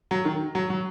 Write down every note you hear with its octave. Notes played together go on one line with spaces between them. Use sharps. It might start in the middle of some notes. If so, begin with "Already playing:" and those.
F#3
D#3
F#3
F#3